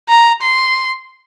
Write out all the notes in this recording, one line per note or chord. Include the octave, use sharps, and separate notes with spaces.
A#5
C6